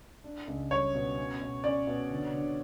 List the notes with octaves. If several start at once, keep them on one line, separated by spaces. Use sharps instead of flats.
D4
C#2
G3 C#5
B2
C#4
B2
C#4 D5
B2
D3
D3